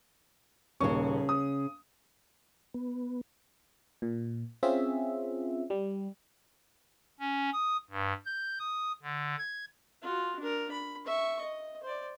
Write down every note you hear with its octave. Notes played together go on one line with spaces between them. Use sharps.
D#1 D#2 C#3 C#4 C#6
D#6
B3
A#2
C4 C#4 F4 G#4 E5
G3
C#4
D#6
G2
G6
D#6
D3
G#6
F4 F#4
D4 A#4
B5
E5 C#6
D#5
C5 D5